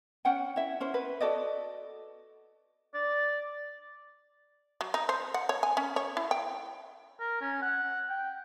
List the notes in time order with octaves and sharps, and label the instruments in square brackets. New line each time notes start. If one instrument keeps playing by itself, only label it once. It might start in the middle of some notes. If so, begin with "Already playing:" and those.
[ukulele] C#4 F#5 G5
E4 E5
C#4 E4 C5
B4
F#4 A4 D5 D#5
[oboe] D5
[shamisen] F#3
D#4
C5
F#5
C#5
G#5
C#4
C#5
E4
G5
[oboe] A#4
C#4
F#5
G5